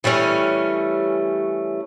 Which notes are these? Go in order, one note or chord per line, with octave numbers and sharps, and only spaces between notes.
E3 G3 A3 C#4